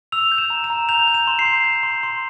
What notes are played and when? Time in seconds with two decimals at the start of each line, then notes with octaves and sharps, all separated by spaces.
0.12 E6 F7
0.32 G6
0.38 E7
0.50 A#5
0.64 E7
0.70 A#5
0.89 G6 F7
1.07 G6
1.14 E7
1.27 C6
1.39 C7
1.45 G6
1.64 G6
1.83 C6
2.03 C6